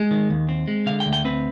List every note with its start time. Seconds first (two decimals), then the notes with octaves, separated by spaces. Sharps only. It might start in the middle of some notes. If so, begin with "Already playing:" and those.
Already playing: G#3
0.11 D#3
0.30 D#2
0.49 C4
0.68 G#3
0.86 D3 F5
1.00 G5
1.06 D2
1.13 G5
1.25 C4 B4